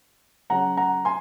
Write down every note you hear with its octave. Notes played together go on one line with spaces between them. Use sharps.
C#3 F#3 C#4 F#5 A#5
F#5 A#5
G#5 C6